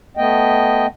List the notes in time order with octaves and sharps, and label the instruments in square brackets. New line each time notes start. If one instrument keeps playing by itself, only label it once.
[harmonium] A3 B3 D#5 G5